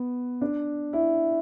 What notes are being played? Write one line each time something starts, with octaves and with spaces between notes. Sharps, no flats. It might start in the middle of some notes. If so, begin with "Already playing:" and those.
Already playing: B3
D4
E4